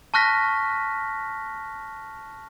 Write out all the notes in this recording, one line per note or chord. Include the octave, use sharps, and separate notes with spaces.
A5 C#6 F6 F#6 A#6 B6